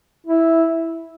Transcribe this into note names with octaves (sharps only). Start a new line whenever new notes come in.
E4